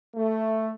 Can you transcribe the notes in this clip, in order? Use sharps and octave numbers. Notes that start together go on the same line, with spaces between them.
A3